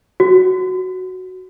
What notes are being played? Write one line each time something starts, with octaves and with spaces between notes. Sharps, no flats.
F#4